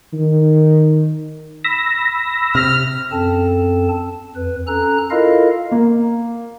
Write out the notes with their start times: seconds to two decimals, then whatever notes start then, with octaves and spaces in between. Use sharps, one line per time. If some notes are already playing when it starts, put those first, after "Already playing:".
0.13 D#3
1.65 B5 E6 A#6
2.55 C3 F6
3.11 F#2 C4 A4 A5
4.36 F2 B4
4.67 C#4 A4 A#5 F#6
5.10 E4 F4 A4 A#4 D#5 F5
5.71 A#3